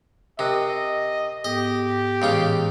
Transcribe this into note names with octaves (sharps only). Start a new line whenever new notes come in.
C3 A#4 D#5 F#6
G#2 B3 G4 A4 D#5
C#2 A2 C#3 E3 F4